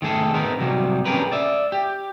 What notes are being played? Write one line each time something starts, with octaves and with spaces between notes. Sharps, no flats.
D#3 A3 G#4 A4
B3 C4 D#4 A#4
C3 F#3 G3
C#4 D4 G4 G#4 A#4 B4
D5 E5
G4